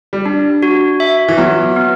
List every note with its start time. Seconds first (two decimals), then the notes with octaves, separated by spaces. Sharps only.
0.13 G3
0.26 D4
0.63 F#4
1.00 E5
1.28 E3
1.38 F#3 B3
1.76 B3